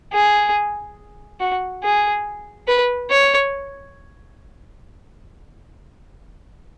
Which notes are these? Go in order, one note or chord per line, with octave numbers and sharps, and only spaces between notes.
G#4
F#4
G#4
B4
C#5